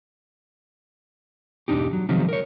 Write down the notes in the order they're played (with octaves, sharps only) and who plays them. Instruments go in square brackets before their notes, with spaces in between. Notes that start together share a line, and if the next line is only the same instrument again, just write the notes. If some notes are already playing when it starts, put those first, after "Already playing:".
[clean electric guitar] B1 E2 A#2 D4 D#4 G4
F#3
C3 D#3 F3 F#3 G#3 C4
A#4 C#5